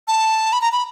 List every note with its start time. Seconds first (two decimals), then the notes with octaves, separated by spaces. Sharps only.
0.08 A5
0.53 B5
0.61 A#5
0.72 B5